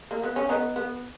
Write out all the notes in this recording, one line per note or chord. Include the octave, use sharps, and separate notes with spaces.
A#3
B3
C#4
B3 D#4
B3